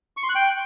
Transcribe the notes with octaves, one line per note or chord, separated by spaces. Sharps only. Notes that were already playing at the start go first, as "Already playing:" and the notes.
C#6
C6
F#6
G5